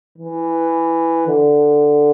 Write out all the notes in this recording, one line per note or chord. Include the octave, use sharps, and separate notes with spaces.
E3
D3